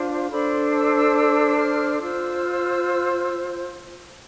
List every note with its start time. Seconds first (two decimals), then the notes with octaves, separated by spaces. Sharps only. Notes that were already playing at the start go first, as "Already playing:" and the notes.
Already playing: D4 F4 C5
0.31 D4 A4 C5 B5
0.52 C6
0.73 E6
0.94 E6
1.16 E6
1.47 E6
1.58 F6
2.00 F4 C5 E6